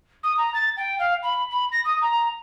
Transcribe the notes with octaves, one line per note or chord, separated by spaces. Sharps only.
D#6
A#5
A6
G5
F5
B5
B5
A#6
D#6
A#5